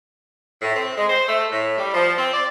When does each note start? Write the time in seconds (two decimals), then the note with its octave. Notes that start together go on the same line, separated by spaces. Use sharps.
0.62 A2
0.76 C4
0.97 G#3
1.09 C5
1.28 A3
1.52 A2
1.78 G3
1.94 F3
2.18 C4
2.34 D5